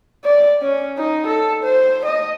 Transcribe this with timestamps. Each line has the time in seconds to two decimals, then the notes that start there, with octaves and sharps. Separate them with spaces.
0.24 D5
0.62 C#4
0.98 D#4
1.27 A4
1.64 C5
2.06 D#5